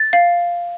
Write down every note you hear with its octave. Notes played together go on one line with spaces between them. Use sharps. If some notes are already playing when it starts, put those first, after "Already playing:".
Already playing: A6
F5